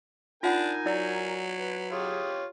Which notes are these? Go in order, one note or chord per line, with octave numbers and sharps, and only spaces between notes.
D4 D#4 F4 A#4 F#5 G#5 B5
F#3 E4 D5 E6
B4
F4 G4 G#4 C#5